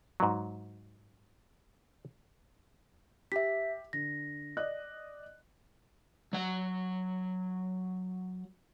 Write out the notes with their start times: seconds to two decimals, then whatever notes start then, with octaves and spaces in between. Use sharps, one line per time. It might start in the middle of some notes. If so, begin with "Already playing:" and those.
0.20 G#2 F#3
3.32 G4 E5 B6
3.93 D3 A#6
4.57 D5 D#5 F#6
6.33 F#3 F#5